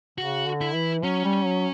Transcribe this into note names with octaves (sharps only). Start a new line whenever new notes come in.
C#3 F#4
D3
E4
E3
F#3 C#4
G3
F#3